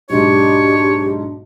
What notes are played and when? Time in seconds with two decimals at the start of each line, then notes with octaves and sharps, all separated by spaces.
0.10 B1 G#2 D4 G4 C#5